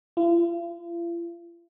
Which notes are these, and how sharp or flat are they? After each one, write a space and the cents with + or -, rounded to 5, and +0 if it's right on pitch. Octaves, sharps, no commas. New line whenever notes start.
F4 -45